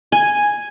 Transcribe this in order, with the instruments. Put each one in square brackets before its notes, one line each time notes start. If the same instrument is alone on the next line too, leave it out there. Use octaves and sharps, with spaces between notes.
[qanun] G#5